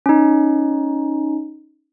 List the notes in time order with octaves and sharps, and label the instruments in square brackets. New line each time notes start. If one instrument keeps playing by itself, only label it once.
[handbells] C#4 D#4